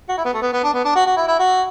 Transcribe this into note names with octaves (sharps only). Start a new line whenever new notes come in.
F#4
E4
B3
A3
B3
B3
D4
B3
D4
F#4
F#4
E4
E4
F#4